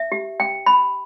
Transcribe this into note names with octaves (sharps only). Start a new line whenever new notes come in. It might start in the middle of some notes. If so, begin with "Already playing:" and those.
Already playing: E5
G4
G5
B5